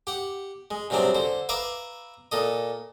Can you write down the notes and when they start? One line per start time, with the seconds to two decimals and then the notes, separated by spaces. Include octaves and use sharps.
0.07 G4 F#5
0.71 G#3
0.90 G2 C3 F#3 G#3 C4 D4
1.15 D3 C5
1.49 B4 E5 F5 A#5 D6
2.32 A#2 A4 D#5